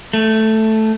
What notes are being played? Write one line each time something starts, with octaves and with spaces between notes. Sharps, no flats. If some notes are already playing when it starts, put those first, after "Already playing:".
A3